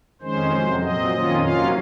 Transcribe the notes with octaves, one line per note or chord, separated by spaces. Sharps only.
F2 D#3 G#3 C#4 C5
F2 C3 F#3
A#2 F#3 C4 D#5
F2 D#3 A#3 C#4 F4
C3 F#3 A#3 C#4 F4 F5